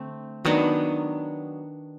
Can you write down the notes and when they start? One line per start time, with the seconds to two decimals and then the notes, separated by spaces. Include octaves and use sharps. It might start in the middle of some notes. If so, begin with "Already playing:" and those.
Already playing: D3 A3 C4
0.45 D#3 F#3 B3 D4